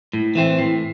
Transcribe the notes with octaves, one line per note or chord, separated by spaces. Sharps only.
A2
E3 A3 C4
A2